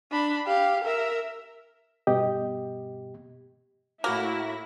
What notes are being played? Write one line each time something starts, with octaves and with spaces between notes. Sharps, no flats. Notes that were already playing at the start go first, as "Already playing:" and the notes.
D4 B5
G4 F5
A#4 E5
G2 B2 G4 D#5
A2 A#3 E4 F#4 A#6